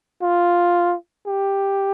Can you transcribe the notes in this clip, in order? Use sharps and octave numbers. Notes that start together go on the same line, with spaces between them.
F4
G4